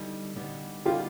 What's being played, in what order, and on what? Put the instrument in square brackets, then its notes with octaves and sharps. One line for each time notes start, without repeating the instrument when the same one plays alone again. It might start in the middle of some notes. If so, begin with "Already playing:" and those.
Already playing: [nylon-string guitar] D3 G3 B3 D#4
D3 G3 B3 D#4
[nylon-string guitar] D3 G3 B3 D#4 [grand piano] F4 G4